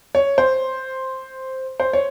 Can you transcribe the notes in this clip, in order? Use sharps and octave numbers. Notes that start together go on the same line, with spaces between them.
C#5
C5
C5
C#5